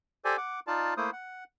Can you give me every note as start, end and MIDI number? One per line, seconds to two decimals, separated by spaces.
0.25 0.37 67
0.25 0.37 69
0.25 0.37 72
0.25 0.37 74
0.25 0.37 80
0.37 0.60 78
0.37 0.60 86
0.67 0.94 63
0.67 0.94 65
0.67 0.94 74
0.67 0.94 81
0.97 1.10 57
0.97 1.10 58
0.97 1.10 64
0.97 1.10 72
0.97 1.10 87
1.13 1.44 78